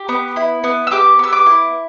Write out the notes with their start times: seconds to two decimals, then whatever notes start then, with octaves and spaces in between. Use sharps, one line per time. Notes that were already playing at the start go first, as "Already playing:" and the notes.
Already playing: G4
0.09 B3
0.36 E4
0.64 B3
0.87 E6
0.92 G4 D6
1.19 B3 E6
1.33 D6
1.46 E4